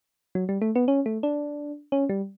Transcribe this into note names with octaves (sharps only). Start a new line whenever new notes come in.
F#3
G3
A3
B3
C#4
A3
D4
C#4
G3